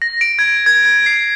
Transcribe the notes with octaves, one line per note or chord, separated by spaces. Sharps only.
A#6
D7
G#6
G#6
G#6
C7